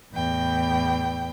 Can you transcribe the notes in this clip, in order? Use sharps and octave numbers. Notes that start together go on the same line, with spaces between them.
E2 A2 G5